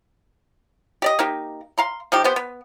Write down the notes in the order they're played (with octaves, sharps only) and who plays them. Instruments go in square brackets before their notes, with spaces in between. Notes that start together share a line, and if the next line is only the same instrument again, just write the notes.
[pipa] G4 D5 D#5
A#3 D#4 G4
F5 A#5 C6
F3 D#4 G4
B3 G4 C5
B3